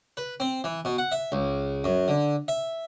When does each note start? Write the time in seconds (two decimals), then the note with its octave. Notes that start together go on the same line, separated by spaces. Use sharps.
0.17 B4
0.40 C4
0.64 E3
0.85 B2
0.98 F#5
1.12 E5
1.32 C#2
1.84 F#2
2.08 D3
2.48 E5